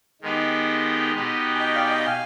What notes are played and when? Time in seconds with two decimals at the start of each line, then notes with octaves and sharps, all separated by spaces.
0.21 D#3 G#3 B3 D#4 G4
1.15 B2 B3 D#4 G4
1.55 G#5
1.60 D#5 G5
1.75 D5 F5
1.85 G#5
1.90 D#5 G5
2.07 F5 G#5